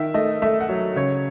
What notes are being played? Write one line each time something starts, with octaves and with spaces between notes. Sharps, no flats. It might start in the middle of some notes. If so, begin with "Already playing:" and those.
Already playing: D#3 E5
A3 D#5
A3 E5
F#5
F#3
C#3 C#5